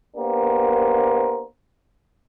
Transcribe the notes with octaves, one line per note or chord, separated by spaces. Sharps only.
A#3 B3 D4 G4 A#4 C5